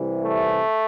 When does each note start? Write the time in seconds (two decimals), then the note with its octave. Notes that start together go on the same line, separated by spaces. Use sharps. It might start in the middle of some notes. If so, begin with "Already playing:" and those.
Already playing: C2 C3 E3
0.22 A3